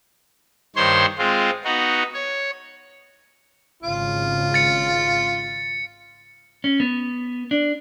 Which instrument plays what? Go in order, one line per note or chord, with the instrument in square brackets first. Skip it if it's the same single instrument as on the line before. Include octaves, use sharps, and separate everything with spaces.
[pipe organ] G2 D#3 C5 C#5 C6
G#3 C4 F4
B3 D#4 F#4
C#5
[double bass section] G#1 C#3 [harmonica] F4
[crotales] A6 C#7
[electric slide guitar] C#4
B3
D4